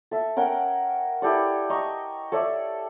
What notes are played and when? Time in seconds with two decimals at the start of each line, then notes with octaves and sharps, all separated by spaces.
0.11 A4 E5
0.36 C#4 A#4 F#5 G5
1.22 E4 G4 A4 D5
1.70 D#5 A#5 C#6
2.32 A4 C#5 D5 E5